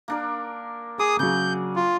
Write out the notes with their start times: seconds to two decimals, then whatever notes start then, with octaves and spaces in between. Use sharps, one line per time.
0.08 A#3 D4 A#4
0.99 G#4 D6 D#6
1.19 C#3 F#3 G#4 G6
1.76 F4